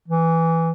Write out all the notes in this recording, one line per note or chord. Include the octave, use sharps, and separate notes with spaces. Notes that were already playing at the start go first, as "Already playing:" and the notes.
E3